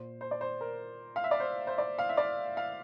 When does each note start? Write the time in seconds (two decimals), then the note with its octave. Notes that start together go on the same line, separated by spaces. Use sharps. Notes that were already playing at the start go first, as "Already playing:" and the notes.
Already playing: A#2 C5
0.21 C5
0.31 D5
0.41 C5
0.61 A#4
1.16 F5
1.24 E5
1.31 D5
1.40 C5
1.67 C5
1.78 D5
1.99 F5
2.09 E5
2.17 D5
2.57 F5